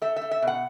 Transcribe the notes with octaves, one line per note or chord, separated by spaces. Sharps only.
A3 E5
E5
A3
E5
B2
F#5